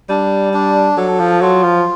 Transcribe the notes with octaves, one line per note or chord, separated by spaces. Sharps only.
G3 D4
D4
F#3 A4
F3
F#3 F4
F3